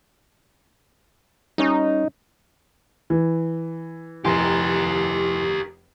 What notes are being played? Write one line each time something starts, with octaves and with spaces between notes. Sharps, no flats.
G3 C#4 D#4 C#5
E3
F1 E4 G4 A#4 G#5 C6